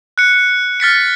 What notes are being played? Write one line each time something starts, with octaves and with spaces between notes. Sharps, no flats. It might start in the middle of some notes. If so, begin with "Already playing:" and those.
F#6 C#7
F6 A6 B6 C#7